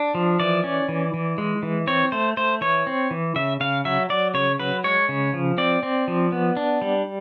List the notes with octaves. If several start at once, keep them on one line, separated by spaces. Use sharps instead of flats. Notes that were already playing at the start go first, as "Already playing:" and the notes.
Already playing: D4
F3
E3 D5
C#4
E3
E3
G#3
E3
C4 C#5
A3 C5
A3 C5
E3 C#5
C4
E3
C#3 E5
C#3 F5
F#3 E5
F#3 D5
C#3 C#5
F#3 B4
G#3 C#5
C#3
F3
C4 D5
C4
F3
B3
D4
G3